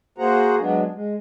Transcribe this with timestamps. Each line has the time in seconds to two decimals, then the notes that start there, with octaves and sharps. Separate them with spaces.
0.18 A#3 F#4 G#4 C5 F#5 A#5
0.59 F#3 G#3 B3 D4
0.92 G#3